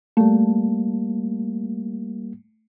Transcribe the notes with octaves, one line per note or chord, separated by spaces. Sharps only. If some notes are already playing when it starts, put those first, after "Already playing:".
G3 A3 A#3